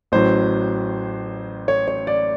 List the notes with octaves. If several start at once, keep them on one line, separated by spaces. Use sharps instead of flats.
A1 A2 F#3 C5
C#5
C#5
D5